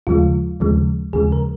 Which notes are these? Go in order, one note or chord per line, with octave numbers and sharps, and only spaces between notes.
D#2 C#3 F3 G#3 F4
D#2 C#3 F3 G#3
D#2 C#3 F3 G#3 G#4
A#4